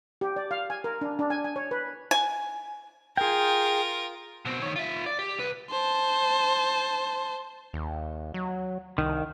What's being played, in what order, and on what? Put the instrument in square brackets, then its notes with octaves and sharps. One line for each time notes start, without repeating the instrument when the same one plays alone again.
[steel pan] G4
D5
F5
G#5
A#4
D4
D4
G#5
G#5
C#5
B4
[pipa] G#5
[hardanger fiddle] F4 A#4 [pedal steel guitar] G#4 G5
[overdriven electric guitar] B2 C4
D#3 C#5
F4 E5
D5
G4
C2 B4
[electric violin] C5 A5
[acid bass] D#2
F#3
[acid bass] C2 [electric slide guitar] D#3